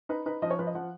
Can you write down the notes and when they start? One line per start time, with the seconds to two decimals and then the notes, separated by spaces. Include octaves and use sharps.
0.09 D#4 B4
0.26 D#4 B4
0.42 F3 D#5
0.50 C#5
0.59 F3 B4
0.67 D#5
0.75 F3 F#5